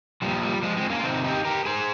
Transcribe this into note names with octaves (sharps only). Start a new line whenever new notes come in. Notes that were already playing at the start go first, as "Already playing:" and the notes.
A#2 F3 G3
G3
F3 G#3
G#3 C4
A#3 C#4
F4
C3 D#3 C4 D#4
D#4 G4
G4 A#4
G#4 C5